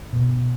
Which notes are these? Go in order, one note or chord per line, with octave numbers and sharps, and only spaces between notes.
B2